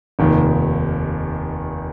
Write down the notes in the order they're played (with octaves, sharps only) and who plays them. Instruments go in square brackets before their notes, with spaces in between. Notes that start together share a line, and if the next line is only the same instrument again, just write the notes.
[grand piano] F1 D#2 D#3